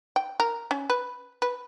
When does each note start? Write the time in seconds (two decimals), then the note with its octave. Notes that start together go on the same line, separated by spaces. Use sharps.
0.16 G5
0.40 A#4
0.71 C#4
0.90 B4
1.42 B4